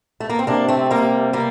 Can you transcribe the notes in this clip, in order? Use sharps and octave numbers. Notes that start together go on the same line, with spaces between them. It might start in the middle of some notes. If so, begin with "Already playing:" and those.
A3
A#3
C4
C3 A#3 D4
A3 C4
G3 A#3
G3 A#3